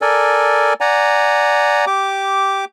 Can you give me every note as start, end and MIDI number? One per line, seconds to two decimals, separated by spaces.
0.02 0.74 69
0.02 0.74 70
0.02 0.74 74
0.02 0.74 80
0.81 1.85 74
0.81 1.85 78
0.81 1.85 80
0.81 1.85 82
1.87 2.65 67
1.87 2.65 86